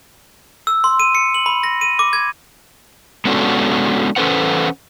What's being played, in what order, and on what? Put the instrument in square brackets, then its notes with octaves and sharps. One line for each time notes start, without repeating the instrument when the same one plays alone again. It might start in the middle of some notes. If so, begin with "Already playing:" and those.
[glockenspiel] E6
C6
D#7
C#7
F#7
B5
A#6
D#7
D6
G#6
[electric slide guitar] G#3 B3 C#4 D4 F#4 A4
E3 C#4 A4 B4 C5 F#5